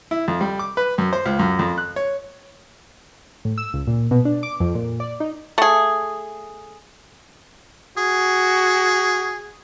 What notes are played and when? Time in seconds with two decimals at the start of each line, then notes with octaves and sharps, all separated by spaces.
0.11 E4
0.28 F2
0.41 G3
0.59 D6
0.77 B4
0.98 F#2
1.13 C5
1.26 C#2
1.39 F#2
1.59 F2
1.78 F#6
1.96 C#5
3.45 A2
3.58 E6
3.73 C#2
3.87 A#2
4.11 B2
4.25 D4
4.43 D6
4.60 F2
4.75 A#2
5.00 D5
5.20 D#4
5.58 A3 G#4
7.98 F#4 G#4